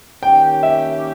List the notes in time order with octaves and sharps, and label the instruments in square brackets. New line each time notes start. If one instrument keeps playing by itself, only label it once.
[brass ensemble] D#3 A#3 C#4 G4 [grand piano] G5
[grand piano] E5